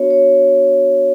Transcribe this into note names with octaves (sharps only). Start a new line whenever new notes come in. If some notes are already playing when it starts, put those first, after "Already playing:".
Already playing: B3 D4 F#4 C#5
C#5